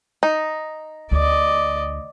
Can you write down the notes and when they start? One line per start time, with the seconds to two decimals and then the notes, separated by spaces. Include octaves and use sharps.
0.23 D#4
1.11 D2 D5 D#5